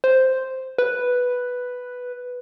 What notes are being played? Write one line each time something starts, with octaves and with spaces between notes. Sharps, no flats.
C5
B4